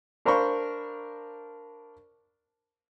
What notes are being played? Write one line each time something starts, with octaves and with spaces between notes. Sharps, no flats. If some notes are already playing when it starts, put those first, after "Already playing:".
D4 A#4 C5 F5 B5 C#6